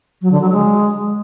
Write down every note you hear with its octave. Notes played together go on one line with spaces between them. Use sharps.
F#3
D3
F#3
G#3